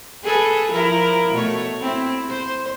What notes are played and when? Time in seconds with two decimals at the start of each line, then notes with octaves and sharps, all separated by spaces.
0.23 G#4 A4 B4
0.72 F3 E4 A#4
1.33 B2 A3 C#5
1.80 C4 E4
2.30 C5